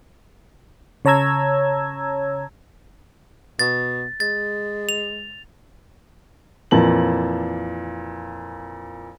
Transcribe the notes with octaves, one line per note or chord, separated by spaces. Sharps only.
C#3 C#5 A5 A#5 E6 G#6
B2 A6
G#3 A6
F7
F2 A#2 E3 A5 F#7